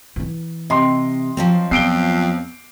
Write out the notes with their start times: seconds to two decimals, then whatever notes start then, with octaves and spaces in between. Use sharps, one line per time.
0.16 E3 E4
0.70 C3 D#5 C6
1.37 F3 F#3 C4
1.71 F2 B3 C7 D7 G7